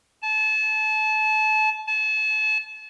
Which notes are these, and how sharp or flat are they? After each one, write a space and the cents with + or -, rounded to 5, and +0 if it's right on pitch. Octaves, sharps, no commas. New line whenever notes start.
A5 -30
A5 -35